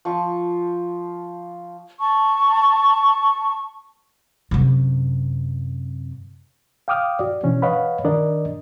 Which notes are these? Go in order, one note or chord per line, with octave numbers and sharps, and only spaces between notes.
F3 C#6
A5 C#6
F#2 C3
F5 G5 D6 D#6 F6
F#4 D5
B2 E3 C#4 D4
B4 C#5 D#5 F5 F#5 B5
D#3 D4 A#4 D5 D#5